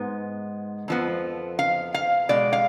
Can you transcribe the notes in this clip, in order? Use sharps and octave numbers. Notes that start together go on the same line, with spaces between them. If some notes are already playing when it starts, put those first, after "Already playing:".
Already playing: G#2 G#3 B3
F2 F3 B3
F5
F5
B2 G#3 D5
F5